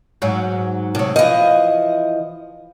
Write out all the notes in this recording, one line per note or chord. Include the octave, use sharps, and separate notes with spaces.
G#2 F#3
A2 C3 F#3
E3 F3 D#5